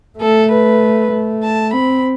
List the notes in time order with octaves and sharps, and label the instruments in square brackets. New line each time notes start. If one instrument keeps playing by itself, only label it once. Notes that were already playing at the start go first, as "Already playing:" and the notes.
[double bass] A3 [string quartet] A4
[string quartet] B4
[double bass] A3
[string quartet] A5
[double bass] C4 [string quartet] B5